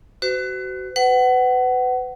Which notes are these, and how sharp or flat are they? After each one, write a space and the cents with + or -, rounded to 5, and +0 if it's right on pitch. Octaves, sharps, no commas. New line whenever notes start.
F#4 +25 C5 -45
B4 +30 F#5 +25